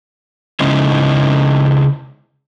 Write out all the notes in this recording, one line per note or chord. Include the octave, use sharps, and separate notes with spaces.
C#3 G#3 C#4 D#4 E4 C5